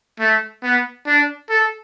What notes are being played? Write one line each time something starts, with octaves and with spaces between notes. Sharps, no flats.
A3
B3
D4
A4